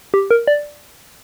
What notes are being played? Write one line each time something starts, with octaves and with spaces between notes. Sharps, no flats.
G4
A#4
D5